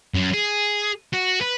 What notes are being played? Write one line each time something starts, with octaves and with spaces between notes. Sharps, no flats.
F#2
G#4
F#4
B4